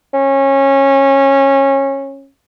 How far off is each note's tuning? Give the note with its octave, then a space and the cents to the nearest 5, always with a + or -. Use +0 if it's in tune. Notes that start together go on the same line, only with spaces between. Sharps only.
C#4 -20